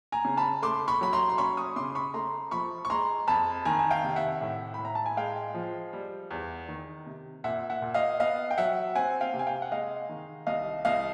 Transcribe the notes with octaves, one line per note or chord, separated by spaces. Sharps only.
G#5 A#5
C#3
A5 B5
A3 C6 D6
B5 C#6
F#3 B5
A#5 C6
C6
C#4 B5 C#6
C#6 D#6
C#3 C6 D6
C6
B5 C#6
A3 A#5 C6
F3 B5 C#6
C#6
G#3 A#5 C6
F2 A5 B5
D#3 G#5 A#5
G#5
F5 G5
C3
E5 F#5
A2
B5
A2
A#5
A5
G#5
G#3 F5 G5
F3
G3
E2
D#3
C3
A#2 E5 F#5
E5 F#5
A#2
D#5 F5
B3 D#5 F5
G5
F#3 E5 F#5
C4 F#5 G#5
F5 G5
C3
G#5
F5 G5
F#5
G#3 D#5 F5
D#3
C2 D#5 F5
C2 D#5 F5